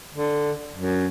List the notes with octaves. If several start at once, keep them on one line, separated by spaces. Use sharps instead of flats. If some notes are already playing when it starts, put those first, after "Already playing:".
D3
F#2